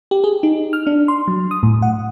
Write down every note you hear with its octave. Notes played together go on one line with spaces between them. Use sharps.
G4
G#4
D#4
F6
D4
C6
F#3
D#6
A2
F#5